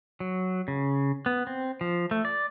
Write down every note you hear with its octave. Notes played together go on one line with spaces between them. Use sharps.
F#3
C#3
B3
C4
F3
A3
D5